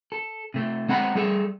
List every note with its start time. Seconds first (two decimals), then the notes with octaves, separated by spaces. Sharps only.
0.12 A4
0.54 C3 A3
0.89 G#3 C4 F#5 A#5 B5
1.15 G3 G#4 A4